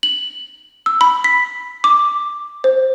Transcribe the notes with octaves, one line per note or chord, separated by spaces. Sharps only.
F#7
E6
B5
B6
D6
C5